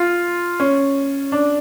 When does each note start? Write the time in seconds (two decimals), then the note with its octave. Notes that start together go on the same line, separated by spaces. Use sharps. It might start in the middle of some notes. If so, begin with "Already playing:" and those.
Already playing: F4
0.60 C#4
1.32 D4